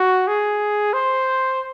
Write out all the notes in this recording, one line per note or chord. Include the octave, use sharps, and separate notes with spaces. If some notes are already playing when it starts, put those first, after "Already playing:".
Already playing: F#4
G#4
C5